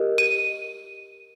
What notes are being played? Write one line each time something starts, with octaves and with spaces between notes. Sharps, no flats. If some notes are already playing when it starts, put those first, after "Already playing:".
Already playing: G4 A#4 D#5
D#7